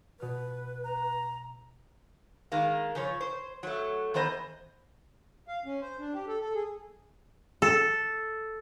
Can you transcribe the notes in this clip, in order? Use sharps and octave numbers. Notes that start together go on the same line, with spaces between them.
B2 B4 F6
A#5
D#3 G#3 A#3
C#3 F3 C#5
C5
F#3 A3
D#3 E3 B3 C5 D#5
F5
C#4
C5
D4
G4
A4
A4
G#4
A4